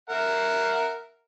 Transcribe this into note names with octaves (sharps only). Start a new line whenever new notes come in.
A#4 E5 F#5